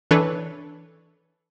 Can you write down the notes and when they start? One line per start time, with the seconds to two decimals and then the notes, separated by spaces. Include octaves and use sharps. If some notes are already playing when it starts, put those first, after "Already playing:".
0.11 E3 D4 A4 B4 C#5